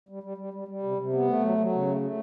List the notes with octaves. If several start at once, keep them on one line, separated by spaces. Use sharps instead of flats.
G3
G3
G3
G3
G3
C3
C3
B3
A3
F#3
F#3
C#3
A3
A3